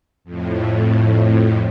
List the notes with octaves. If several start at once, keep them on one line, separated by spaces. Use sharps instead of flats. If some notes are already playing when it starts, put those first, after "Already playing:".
F2 A2